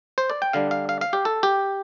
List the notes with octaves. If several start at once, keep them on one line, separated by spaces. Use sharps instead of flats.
C5
D5
G5
D3 G3 D4 F5
F5
F5
F5
G4
A4
G4